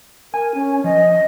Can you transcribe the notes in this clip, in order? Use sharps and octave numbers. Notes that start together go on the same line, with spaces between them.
A#4 G#5
C#4
F3 D#5